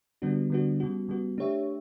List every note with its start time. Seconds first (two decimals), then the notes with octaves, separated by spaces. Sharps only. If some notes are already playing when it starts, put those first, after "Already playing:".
0.22 D3 G3 B3 D4 F#4
0.50 D3 G3 B3 D4 F#4
0.80 C#3 G3 B3 F#4
1.09 C#3 G3 B3 F#4
1.38 A3 D4 G4 C#5 E5